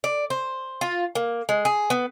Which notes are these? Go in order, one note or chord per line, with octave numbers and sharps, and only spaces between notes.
D5
C5
F4
A#3
G#3
G#4
B3